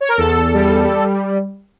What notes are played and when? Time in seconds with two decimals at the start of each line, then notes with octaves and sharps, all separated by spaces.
0.01 C#5
0.09 A#4
0.17 E2 A4
0.54 G3